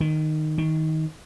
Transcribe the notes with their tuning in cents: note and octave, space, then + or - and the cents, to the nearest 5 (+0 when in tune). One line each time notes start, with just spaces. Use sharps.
D#3 -10
D#3 +20